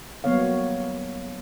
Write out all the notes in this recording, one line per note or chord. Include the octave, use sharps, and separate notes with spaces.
F#3 G3 A#3 B3 C#5 F5